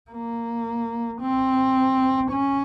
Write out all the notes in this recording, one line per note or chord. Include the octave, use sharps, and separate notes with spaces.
A#3
C4
C#4